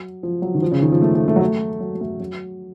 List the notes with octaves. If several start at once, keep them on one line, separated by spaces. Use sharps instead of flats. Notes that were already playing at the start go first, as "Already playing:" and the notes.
Already playing: F#3
F3
F#3
D#3
F3
C#3
D#3
F3
A3
A3
A3
F#3
A3
F#3
F#3
A3
F#3